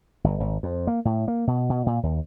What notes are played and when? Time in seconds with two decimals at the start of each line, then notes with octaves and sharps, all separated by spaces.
0.24 G1
0.40 G#1
0.63 F2
0.87 A#3
1.05 A2
1.28 A#3
1.47 B2
1.70 B2
1.86 A#2
2.03 D#2